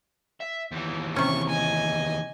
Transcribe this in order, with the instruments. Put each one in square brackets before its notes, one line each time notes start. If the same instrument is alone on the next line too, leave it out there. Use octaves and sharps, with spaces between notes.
[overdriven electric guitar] E5
D#2 E3
[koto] C3 C#4 [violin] C#6
[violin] D#5 G#5